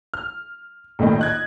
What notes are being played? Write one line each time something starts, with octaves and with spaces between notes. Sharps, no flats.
F6
A#1 A2 D#3 D#4
D#5 F#6 G#6